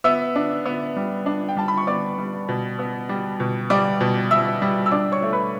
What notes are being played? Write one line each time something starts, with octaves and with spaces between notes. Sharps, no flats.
B3 E5 E6
D4
B3
G3
D4
G5
G3 A5
B5
C#6
B3 D5 D6
G3
B2
B3
G3
B2
G3 D5 D6
B2
G3 E5 E6
G3
E6
D4 D5 D6
C#5 C#6
A3
B4 B5